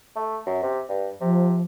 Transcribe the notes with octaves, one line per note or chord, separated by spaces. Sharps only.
A3
F#2
C3
G2
C3 F3